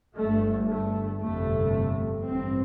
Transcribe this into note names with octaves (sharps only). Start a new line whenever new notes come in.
G1 G2 A3
A3
G1 F2 C3 A3
A1 G2 C4